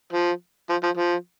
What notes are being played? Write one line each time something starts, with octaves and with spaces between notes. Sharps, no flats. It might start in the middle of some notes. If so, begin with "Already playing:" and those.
F3
F3
F3
F3